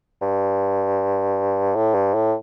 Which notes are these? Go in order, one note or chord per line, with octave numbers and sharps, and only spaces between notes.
G2
A2
G2
A2